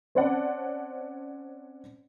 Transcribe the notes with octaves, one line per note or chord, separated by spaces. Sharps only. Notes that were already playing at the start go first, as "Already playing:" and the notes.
C4 C#4 C5 D5 F#5 A5